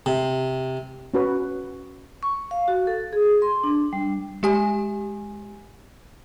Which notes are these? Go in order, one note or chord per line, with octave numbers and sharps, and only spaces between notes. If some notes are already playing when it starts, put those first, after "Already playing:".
C3
C#4 F#4 B4
C#6
F5
F#4
A4
G#4
C6
D4
G3
G#3 G4 G#5